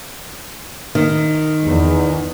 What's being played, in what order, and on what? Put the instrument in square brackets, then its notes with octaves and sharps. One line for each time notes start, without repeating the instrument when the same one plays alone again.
[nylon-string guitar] D#3
[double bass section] E2